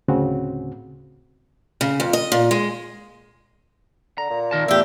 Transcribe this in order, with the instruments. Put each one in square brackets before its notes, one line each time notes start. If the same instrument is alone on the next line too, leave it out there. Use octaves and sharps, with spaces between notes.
[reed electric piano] D2 A2 C#3 C4 F#4
[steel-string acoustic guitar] C#3
F2
D#5
A#2
G#3
[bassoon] D3 [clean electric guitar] A#5
[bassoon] A#2
[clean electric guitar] D#3 A#4 A5
[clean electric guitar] E2 A2 [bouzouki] D4 G4 [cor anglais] E5